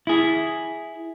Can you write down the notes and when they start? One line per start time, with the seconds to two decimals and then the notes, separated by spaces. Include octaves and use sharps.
0.07 E4 G#4